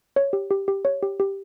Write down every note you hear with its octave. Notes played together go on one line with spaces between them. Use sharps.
C#5
G4
G4
G4
C#5
G4
G4